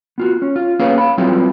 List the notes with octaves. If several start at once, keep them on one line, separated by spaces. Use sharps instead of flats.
B3 F4 F#4
C#4
F4
A#3 B3 C#4 G#4 C#5 F5
F5 B5
F#3 G3 B3 C4 E4 F4